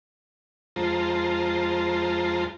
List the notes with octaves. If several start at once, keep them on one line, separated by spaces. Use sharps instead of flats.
F2 G#3 F4 C5 A5 A#5